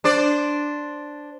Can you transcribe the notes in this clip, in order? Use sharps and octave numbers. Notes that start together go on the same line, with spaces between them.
D4 C5 D5